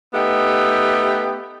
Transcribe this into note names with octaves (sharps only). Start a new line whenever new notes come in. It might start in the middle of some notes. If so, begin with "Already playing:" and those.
A3 B3 D#4 G4